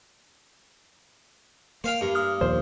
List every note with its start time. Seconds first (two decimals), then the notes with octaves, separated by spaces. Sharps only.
1.84 A#3 C5 F5 G5
2.01 G2
2.15 D#6 F6
2.41 A#1 D#2 A#2 C5